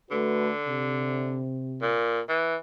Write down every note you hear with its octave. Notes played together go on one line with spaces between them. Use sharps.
D3 A3 F#4 B4
C3
A#2
E3